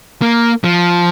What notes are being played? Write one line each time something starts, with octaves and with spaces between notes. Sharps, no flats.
A#3
F3